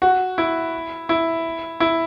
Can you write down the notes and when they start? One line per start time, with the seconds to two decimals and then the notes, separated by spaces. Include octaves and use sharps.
0.02 F#4
0.38 E4
1.09 E4
1.80 E4